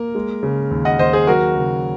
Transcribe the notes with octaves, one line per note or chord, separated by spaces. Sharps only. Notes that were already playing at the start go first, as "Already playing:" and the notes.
Already playing: A#3 A#4
G#3
C#3
D#2
D#5 F#5
D#2 C5 D#5
G#4 C5
F#3 F#4 A#4
C#3